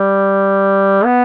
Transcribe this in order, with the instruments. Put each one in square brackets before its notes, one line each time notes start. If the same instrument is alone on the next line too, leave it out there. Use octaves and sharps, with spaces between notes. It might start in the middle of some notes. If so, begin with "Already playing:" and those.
Already playing: [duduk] G3
B3